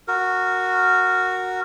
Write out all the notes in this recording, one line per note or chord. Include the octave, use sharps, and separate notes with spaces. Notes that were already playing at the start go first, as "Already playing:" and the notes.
F#4 A#4